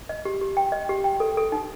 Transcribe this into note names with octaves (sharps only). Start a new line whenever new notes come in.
D#5
G4
G4
G5
D#5
G4
G5
A4
A4
D#4